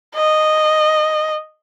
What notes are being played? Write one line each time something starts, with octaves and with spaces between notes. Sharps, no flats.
D#5